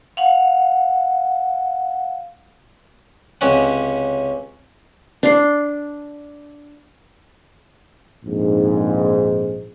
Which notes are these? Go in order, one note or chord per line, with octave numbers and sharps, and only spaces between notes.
F5 F#5
C#2 C3 C#4 F#5
D4 C6
A#1 F2 G#2